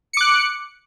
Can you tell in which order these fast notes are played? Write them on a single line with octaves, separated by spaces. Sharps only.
C#7 D6 F#6